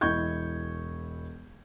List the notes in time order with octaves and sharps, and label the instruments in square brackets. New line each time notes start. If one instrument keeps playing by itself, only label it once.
[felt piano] E1 E4 D#5 C#6 G6 G#6